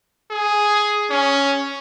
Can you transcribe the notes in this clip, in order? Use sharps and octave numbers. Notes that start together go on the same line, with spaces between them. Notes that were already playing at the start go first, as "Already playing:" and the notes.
G#4
C#4